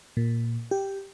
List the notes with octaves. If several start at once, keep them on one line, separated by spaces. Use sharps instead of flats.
A#2
G4